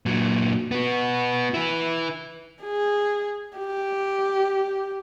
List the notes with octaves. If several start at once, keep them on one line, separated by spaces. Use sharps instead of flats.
A#2 F#3
B3 F#4
E4 B4
G#4
G4